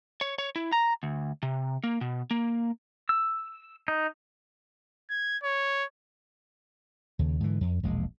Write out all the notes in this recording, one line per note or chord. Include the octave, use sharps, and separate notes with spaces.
C#5
C#5
E4
A#5
D2
C3
A#3
B2
A#3
E6
D#4
G#6
C#5
D#2 C#3
G#2 D3 E3
F2
E1 A#1 G#3